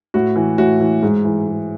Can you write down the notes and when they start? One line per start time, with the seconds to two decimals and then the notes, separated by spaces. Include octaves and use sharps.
0.14 A2 F#4
0.36 E3
0.58 A2 F#4
0.81 E3
1.03 G#2
1.24 E3
1.47 G#2